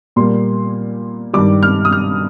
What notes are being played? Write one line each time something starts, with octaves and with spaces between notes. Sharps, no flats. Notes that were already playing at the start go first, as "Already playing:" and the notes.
A#2 G3 A#3 C6
G2 D#3 G3 D6
F6
D#6
F6